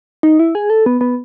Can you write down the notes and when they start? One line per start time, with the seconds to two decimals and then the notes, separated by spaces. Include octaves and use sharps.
0.23 D#4
0.39 E4
0.55 G#4
0.70 A4
0.86 B3
1.01 B3